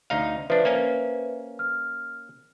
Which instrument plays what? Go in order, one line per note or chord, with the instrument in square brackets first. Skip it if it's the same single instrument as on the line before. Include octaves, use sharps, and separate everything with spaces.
[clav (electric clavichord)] D2 D#4 F5
[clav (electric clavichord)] F3 D4 [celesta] B4 C5 E5
[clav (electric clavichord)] A#3 C#4 G#5
[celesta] F6